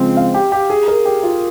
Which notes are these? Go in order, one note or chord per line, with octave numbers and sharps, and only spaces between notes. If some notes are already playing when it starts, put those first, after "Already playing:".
Already playing: C#3 F3 G#3 C4
F5
G4
G4
G#4
A#4
G4
F4